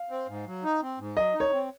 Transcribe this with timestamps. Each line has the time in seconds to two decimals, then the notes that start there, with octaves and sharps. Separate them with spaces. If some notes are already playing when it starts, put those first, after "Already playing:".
Already playing: F5
0.10 C4
0.28 G#2
0.47 F#3
0.64 D#4
0.82 C4
0.99 G#2
1.16 F#3 D#5
1.34 D#4
1.40 C#5
1.52 C4